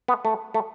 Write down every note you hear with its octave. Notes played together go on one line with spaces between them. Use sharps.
B3
A3
A3